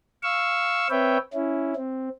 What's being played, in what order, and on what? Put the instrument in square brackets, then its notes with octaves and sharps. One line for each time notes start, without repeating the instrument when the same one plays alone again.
[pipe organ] F5 C#6 E6
C4 B4 C#5 E5 G5
C#4 E4
C4